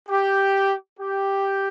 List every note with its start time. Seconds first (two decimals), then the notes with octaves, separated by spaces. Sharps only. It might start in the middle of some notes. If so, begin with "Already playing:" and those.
0.09 G4
0.99 G4